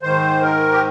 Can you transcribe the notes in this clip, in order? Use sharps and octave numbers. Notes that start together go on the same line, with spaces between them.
G#2 D#3 C5
A#4
G4